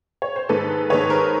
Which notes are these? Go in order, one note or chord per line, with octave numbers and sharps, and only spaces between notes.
C#5
C5
G#2 D#3 G#3 A4 B4
G#2 D#3 G#3 B4 C#5
A#4 C5